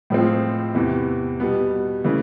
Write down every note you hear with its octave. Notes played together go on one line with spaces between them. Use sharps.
A2 F3 G#3 C4
E2 C3 E3
B2 G3 B3
C#3 E3 A3